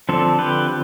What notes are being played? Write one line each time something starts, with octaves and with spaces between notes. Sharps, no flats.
D3 F3 C4 A4
G4 B4